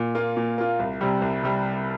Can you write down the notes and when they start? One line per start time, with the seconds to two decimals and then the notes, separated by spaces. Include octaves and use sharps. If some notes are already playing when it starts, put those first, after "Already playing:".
Already playing: A#2
0.15 A#3 F4
0.37 A#2
0.58 A#3 F4
0.79 C2
1.01 C3 G3
1.22 C2
1.43 C3 G3